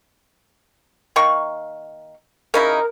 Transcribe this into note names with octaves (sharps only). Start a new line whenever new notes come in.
D#3 A#3 C#6
C#3 D#4 E4 A#4